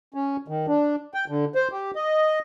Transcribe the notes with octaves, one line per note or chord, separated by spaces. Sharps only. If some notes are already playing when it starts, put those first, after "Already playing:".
C#4
D#3
D4
G5
D3
C5
G4
D#5